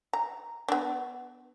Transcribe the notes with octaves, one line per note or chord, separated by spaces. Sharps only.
A#5
B3 D4